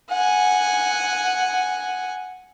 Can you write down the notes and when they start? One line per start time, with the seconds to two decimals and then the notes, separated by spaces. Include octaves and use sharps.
0.10 F#5 G#5